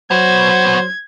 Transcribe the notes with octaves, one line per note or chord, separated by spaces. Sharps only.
F#3 B3 F#4 C5 G#6